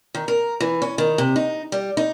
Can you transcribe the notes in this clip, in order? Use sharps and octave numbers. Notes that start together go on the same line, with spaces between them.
D#3
A#4
E3
C#4
D#3
C3
D#4
G3
D#4